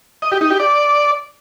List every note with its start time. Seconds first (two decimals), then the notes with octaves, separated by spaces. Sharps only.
0.22 D#5
0.32 G4
0.41 D#4
0.50 G4
0.60 D5